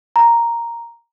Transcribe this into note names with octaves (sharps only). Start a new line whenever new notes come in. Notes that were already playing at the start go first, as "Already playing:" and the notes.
A#5